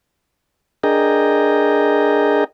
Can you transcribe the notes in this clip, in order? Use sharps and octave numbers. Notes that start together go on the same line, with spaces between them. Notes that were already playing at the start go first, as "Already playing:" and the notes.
D4 G#4 A#4 D#5 G5 A#5